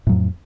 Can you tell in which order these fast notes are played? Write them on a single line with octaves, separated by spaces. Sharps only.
A2 F#3 F2